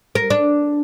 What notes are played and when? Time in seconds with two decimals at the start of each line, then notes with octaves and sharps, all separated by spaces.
0.15 A#4
0.30 D4